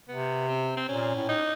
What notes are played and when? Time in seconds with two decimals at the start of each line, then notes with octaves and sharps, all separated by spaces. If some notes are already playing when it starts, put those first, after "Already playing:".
0.08 C3 B3
0.48 C4
0.77 C4
0.88 A#2 C#4
1.15 A2
1.29 D#4